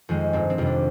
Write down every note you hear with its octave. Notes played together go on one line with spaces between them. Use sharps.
F2 D#3 G#3
G1 C4
C4
F2 C3 G3
D4